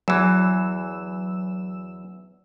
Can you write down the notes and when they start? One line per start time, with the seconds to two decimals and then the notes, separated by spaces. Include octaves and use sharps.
0.08 E2 E3 F#3 E6 E7